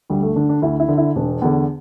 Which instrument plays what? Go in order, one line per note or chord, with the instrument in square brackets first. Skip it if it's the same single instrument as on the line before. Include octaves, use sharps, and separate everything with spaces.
[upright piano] D2 G3
A3
D3 D4
D4
D2 E4
E4
D3
E4
E1 D4
E2 D3